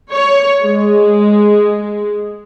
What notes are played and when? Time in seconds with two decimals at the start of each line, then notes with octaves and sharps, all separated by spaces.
0.12 C#5
0.63 G#3